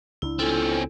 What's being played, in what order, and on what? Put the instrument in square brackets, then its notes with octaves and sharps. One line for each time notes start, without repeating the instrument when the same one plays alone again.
[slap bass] C#2 D4 [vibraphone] E4
[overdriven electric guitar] C4 C#4 [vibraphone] E4 F4 A4